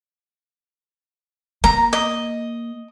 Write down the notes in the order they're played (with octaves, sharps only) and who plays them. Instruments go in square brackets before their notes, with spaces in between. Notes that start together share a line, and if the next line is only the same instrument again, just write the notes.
[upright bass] A#3 [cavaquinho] A#5
[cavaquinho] D#5